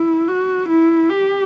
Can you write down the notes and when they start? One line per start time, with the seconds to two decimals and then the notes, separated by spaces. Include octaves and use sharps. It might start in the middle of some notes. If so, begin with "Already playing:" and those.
Already playing: E4
0.28 F#4
0.69 E4
1.10 G4